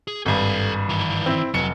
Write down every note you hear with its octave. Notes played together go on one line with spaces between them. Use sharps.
G#4
G#1 G2 A4 G#5
D#3 E3
C4 E4
F1 F#3 C#7